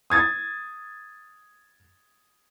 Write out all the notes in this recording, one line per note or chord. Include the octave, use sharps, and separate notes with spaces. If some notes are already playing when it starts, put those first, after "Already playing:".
D#6 G#6 A6